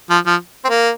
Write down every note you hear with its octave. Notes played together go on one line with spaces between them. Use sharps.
F3
F3
C4
A#3